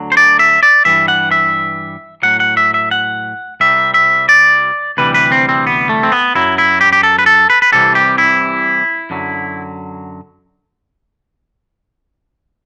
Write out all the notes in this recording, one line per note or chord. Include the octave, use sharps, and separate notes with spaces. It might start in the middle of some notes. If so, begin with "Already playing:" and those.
Already playing: D2 D3 F#3
C5
D5
E5
D5
G2 E3 G3 E5
F#5
E5
A2 F#3 F#5
F#5
E5
E5
F#5
C2 C3 G3 E5
E5
D5
D2 C3 E3 G3 B4
B4
C4
C4
B3
A3
C4
B3
F#2 F#3 E4
E4
G4
G4
A4
B4
A4
B4
B4
C2 C3 E3 G3 A4
G4
E4
F#2 D3 F#3